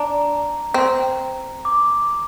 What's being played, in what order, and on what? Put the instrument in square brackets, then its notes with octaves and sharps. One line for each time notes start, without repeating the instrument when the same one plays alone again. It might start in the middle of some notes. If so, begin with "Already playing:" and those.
Already playing: [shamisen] D4 [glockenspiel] A#5
[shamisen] C4
[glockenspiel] D6